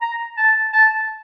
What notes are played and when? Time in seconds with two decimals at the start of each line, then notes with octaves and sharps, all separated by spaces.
0.01 A#5
0.37 A5
0.73 A5